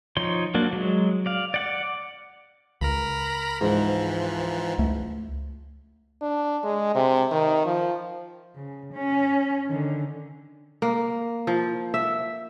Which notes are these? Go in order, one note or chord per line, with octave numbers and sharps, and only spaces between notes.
F3 D#4 C#5 C6
F#3 A#3 D4
F#3 G#3
D5 F5
D5 F#5 D6
C#2 A#4 A#5 B5
G#2 E3 F3
C#2 A3
D4
G#3
C3
D#3
F3
C#3
C#4
D3 D#3
A#3
F3
E5